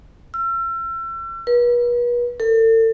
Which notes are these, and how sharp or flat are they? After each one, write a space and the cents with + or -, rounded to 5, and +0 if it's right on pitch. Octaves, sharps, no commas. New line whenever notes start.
E6 +40
B4 -40
A4 +40